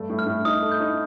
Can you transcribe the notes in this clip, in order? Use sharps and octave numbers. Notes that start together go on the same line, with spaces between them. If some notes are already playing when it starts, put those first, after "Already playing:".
Already playing: G2 A3
A2
F6
A2
D#4 D#6
A3
G6
D#4